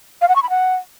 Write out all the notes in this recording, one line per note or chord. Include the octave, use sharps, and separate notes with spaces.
F5
F#5
C#6
B5
F#5